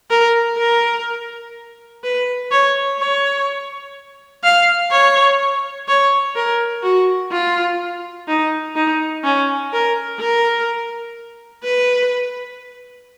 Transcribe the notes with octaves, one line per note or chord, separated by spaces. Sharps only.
A#4
A#4
B4
C#5
C#5
F5
C#5
C#5
A#4
F#4
F4
D#4
D#4
C#4
A#4
A#4
B4